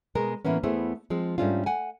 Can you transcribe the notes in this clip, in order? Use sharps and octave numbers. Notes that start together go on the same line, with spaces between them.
B2 G#3 A#4
A2 E3 A#3 B3 C#4
E2 A3 B3 E4 G#4 C5
F3 G#3 C4
G#2 G3 A3 C#4 D4 F4
F#5 G#5